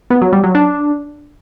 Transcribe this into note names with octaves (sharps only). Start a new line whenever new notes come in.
B3
F#3
G3
F#3
D4